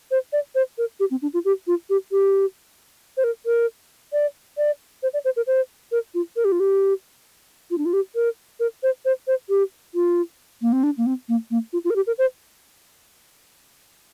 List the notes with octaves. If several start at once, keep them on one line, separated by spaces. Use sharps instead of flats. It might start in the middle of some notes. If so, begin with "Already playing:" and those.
C5
D5
C5
A#4
G4
C4
D4
F4
G4
F4
G4
G4
C5
A#4
A#4
D5
D5
C5
D5
C5
A#4
C5
A#4
F4
A#4
G4
F4
G4
F4
D4
F4
G4
A#4
A#4
C5
C5
C5
G4
F4
A#3
C4
D4
A#3
C4
A#3
A#3
F4
F4
A#4
G4
A#4
C5